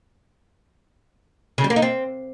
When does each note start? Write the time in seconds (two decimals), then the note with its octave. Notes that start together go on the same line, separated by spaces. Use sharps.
1.58 C#3
1.64 G3
1.70 A#3
1.76 D#4
1.82 C4